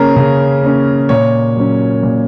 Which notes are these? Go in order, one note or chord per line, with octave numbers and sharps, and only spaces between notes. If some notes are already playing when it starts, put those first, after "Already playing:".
Already playing: C#3 A#3 C#4 G#4 A#4
C#3
A#3 C#4
A#2 C#5
F#3 C#4
A#2